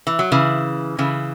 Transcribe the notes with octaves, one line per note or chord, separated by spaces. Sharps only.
E3
F#3
C#3 E3
C#3 E3